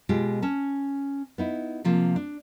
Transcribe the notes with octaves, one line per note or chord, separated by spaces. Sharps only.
B2 G#3 F4 G4
C#4 A5
B3 D#4 E4
C3 F3 A#3
D4